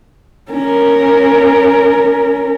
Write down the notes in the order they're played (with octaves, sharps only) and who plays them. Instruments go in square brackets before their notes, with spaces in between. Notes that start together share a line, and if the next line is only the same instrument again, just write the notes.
[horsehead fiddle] C#4 A#4